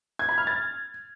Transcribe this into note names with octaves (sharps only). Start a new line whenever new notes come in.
G#6
B5
F6
A6